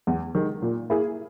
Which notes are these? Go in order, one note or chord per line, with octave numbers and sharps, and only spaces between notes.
E2
D#3 G#3
A#2
A#3 E4 G#4